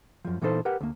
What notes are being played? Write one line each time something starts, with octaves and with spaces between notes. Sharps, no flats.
F#2 F3
A#2 E3 B3 D#4 A4 C5
G4 A#4 B4 F#5
D2 A#3